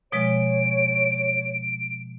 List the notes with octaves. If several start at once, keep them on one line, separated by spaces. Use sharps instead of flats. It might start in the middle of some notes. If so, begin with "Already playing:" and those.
B2 F3 G#3 C#5 D7